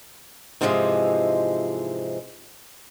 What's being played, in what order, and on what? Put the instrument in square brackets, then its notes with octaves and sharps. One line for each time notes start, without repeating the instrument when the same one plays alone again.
[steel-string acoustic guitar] G#2 C3 E3 F3 G3 G#3